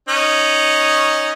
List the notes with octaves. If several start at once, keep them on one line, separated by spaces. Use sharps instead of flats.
C#4 D#4